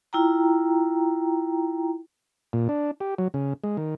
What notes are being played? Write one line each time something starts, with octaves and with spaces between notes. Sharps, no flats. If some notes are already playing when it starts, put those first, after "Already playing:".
E4 F4 G5 A#5
A#2
D4
G4
F#3
C#3
G#3
D#3